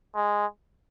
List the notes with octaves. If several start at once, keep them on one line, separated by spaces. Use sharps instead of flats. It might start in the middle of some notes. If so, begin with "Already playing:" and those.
G#3